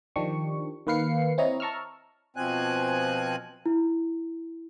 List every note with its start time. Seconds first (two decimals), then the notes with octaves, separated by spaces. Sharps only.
0.16 D#3 F3 D4 G4 C#6
0.87 D#3 A#3 B4 F5 C7 C#7
1.38 C4 E4 C#5 D#5 A#5
1.60 A5 A#5 C#6 E6 F6
2.36 B2 F3 C4 G#5 F#6
3.66 E4